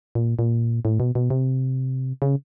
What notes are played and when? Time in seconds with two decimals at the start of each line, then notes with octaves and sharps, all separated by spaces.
0.15 A#2
0.39 A#2
0.85 A2
1.00 B2
1.15 B2
1.30 C3
2.22 C#3